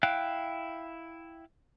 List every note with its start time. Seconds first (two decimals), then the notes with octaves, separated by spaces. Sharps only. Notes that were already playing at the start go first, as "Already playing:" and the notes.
0.03 E4 F5 G5 F#6